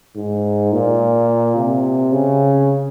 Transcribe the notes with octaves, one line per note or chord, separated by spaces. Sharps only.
G#2
A#2
C3
C#3